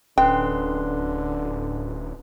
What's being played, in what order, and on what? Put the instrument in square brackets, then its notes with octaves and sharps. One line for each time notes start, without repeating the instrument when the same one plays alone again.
[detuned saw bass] D1 [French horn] D3 [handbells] C#4 B4 C6 [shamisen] G5